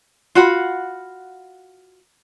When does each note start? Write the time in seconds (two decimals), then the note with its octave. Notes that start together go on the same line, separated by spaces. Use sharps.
0.35 F4 F#4 F#5 B5